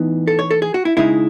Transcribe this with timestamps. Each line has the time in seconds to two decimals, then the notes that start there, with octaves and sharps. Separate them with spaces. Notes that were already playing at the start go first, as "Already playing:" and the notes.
Already playing: A2 E3 B3 D#4
0.27 A4
0.39 C#5
0.51 A4
0.62 G#4
0.74 F#4
0.85 E4
0.97 C#3 G#3 D#4 E4